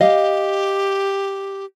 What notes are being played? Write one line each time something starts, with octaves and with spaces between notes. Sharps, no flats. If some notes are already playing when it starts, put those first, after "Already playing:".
G4 D#5 F5